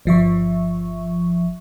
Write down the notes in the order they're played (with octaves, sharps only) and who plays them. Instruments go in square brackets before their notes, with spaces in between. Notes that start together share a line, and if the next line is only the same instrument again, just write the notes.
[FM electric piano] G1 F3 E5 C#6